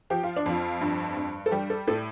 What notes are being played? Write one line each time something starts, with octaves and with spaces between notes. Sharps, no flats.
F3 G4
F4
D4
F2 F4
G2
G2
A4
G3 G4
A4
A2 A4